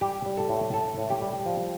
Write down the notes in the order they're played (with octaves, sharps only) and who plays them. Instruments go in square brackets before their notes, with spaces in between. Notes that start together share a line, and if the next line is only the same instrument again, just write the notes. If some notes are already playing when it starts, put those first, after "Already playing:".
[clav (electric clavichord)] G3 G4
G3
A4
A2
A2 A4
A2
G4
G3
F3